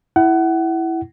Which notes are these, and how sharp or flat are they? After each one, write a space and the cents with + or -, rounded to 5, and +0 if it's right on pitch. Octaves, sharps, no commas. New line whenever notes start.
E4 +0 F#5 +25